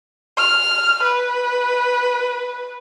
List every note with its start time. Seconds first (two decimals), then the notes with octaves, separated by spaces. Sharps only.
0.38 F6
1.03 B4